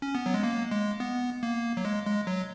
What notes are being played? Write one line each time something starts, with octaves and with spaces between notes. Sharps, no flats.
C#4
B3
F#3
G#3
A#3
G#3
B3
A#3
F#3
G#3
G#3
F#3